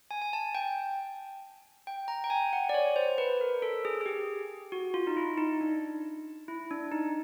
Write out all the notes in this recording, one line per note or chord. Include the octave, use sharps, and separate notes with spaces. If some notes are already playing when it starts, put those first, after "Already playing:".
G#5
G#5
A5
G5
G5
A#5
G5
G#5
F#5
D5
C#5
C5
B4
A#4
A4
G#4
G#4
G4
F#4
F4
D#4
E4
D#4
D4
E4
D4
D#4